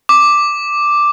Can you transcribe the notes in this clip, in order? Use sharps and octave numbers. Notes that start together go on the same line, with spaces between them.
D6